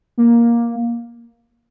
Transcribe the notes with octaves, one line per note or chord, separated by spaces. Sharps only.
A#3